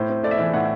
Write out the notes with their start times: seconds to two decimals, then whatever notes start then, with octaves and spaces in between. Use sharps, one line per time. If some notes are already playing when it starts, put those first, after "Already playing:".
Already playing: A2 C5
0.09 C4
0.23 A3 D5
0.31 E5
0.38 E3 D5
0.54 A2 F#5